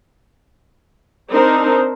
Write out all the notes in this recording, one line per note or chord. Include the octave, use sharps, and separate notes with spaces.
C4 D4 D#4 A#4 C5